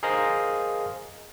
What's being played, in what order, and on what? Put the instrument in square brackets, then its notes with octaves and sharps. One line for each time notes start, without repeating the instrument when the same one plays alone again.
[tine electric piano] G#4 A#4 C5 D#5 F5 A#5